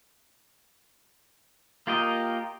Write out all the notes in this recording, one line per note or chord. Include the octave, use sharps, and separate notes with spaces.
A#3 F4 G4 A#4 D#5